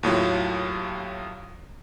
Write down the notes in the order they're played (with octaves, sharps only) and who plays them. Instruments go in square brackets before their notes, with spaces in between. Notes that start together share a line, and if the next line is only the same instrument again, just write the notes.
[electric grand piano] D#2 A2 F#3 F4